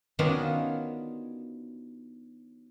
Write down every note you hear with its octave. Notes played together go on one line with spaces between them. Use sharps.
D#3 F#3 B3 C#4 D4 F4